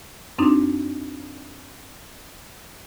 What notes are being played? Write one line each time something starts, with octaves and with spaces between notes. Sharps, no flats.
F#2 C4 D4 D#4